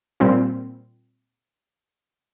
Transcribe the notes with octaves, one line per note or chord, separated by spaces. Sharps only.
A#2 G3 C4 F4